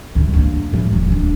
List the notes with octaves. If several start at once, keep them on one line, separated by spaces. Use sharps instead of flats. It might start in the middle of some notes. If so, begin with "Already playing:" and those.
D2 A#2
A#3 D4
A2 F3
D#1 C#4
D1 D4